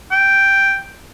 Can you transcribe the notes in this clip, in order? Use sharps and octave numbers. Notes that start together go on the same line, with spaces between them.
G5